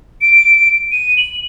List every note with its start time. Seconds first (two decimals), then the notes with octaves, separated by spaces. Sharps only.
0.21 D7
0.91 D#7
1.17 F#7